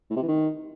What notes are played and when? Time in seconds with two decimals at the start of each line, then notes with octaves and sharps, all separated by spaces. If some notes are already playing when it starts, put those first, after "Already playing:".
0.10 A2
0.16 C3
0.22 E3
0.28 D#3